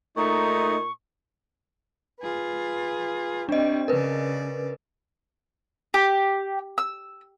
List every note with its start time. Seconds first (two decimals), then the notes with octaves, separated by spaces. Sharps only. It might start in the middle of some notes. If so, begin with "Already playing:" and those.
0.16 A#2 A3 D#4 C#6
2.21 F4 G#4 B4
3.49 C3 G3 C4 D4 D#5
3.88 C#3 A#4 B4 D5
5.94 G4
6.78 E6